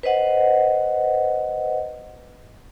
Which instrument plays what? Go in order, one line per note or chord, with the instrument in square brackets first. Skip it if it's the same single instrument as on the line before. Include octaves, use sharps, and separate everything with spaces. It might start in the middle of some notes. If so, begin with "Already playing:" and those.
[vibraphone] B4 C5 D#5 F#5